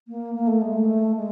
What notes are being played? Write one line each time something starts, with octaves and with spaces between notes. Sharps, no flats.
A#3
A#3
A3
G#3
A3
G#3